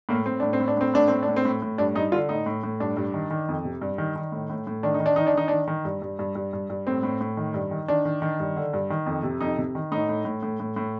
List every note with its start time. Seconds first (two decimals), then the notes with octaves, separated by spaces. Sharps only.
0.09 A2 A#3
0.26 A2 C4
0.40 A2 D4
0.53 C4
0.60 A2
0.68 D4
0.77 A2 C4
0.94 A2 D4
1.08 A2 C4
1.23 D4
1.28 A2
1.36 C4
1.45 A2
1.62 A2
1.78 G2 D4
1.95 G2 D#4
2.12 D3 F4
2.29 A2 D#4
2.46 A2
2.63 A2
2.80 G2 D4
2.97 G2
3.14 D#3
3.30 D#3
3.49 F2
3.65 C3
3.82 G2
3.98 D#3
4.16 D#3
4.32 A2
4.50 A2
4.67 A2
4.83 D#3 D4
4.94 D#4
5.00 D#3
5.06 D4
5.16 D#3 D#4
5.27 D4
5.35 D#3 D#4
5.48 D#3 D4
5.68 D#3
5.85 G2
6.02 G2
6.19 G2
6.35 G2
6.53 G2
6.70 G2
6.87 A2 C4
7.03 A2
7.21 A2
7.37 D#3
7.54 G2
7.71 D#3
7.88 D#3 D4
8.05 D#3
8.22 D#3
8.40 G2
8.56 D3
8.73 G2
8.90 D#3
9.06 F2
9.23 C3
9.40 F2 D#4
9.58 C3
9.75 D#3
9.92 A2 D#4
10.09 A2
10.25 A2
10.43 A2
10.60 A2
10.76 A2